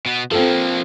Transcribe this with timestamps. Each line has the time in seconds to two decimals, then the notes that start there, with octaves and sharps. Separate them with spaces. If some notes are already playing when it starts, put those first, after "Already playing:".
0.06 B2 B3
0.31 F3 A#3 C4 F4 A4